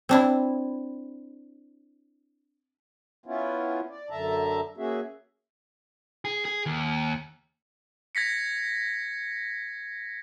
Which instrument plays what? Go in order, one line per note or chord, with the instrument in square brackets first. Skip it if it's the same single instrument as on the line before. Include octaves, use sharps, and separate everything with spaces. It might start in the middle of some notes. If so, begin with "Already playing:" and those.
[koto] C4 D4 E4
[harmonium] B3 C#4 E4 F4
D5
F#2 D3 E5 A5 A#5
A#3 C#4 F#4 G#4 E5
[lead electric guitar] G#4
G#4
D#2
[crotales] G#6 A#6 B6 C#7